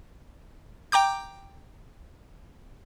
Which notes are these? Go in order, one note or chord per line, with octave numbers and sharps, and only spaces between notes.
G5 A#5 D6 G6